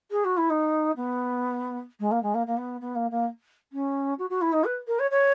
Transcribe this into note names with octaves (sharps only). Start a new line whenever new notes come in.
G#4
F#4
E4
D#4
B3
G#3
A#3
G#3
A#3
A#3
B3
B3
A#3
A#3
C#4
F#4
F#4
E4
D#4
B4
A#4
C#5
C#5